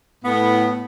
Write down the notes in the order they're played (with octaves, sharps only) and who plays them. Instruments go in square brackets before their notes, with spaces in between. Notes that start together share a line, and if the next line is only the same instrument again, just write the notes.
[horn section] A2 B3